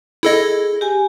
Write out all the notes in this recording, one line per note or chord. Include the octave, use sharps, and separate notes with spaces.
E4 G#4 A4 D#5
G4 G#5